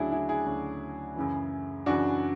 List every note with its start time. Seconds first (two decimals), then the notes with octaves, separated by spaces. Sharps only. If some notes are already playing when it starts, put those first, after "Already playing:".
Already playing: D2 C#3 F#3 D4 E4 F#4 G#4
0.11 E4 G#4
0.29 E4 G#4
0.46 D2 C#3 F#3
1.16 F#2 C#3 E3
1.86 F#2 C#3 E3 D4 F#4